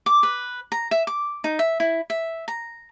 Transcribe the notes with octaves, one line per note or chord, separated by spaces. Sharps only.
D6
B4
A#5
E5
D6
D#4
E5
E4
E5
A#5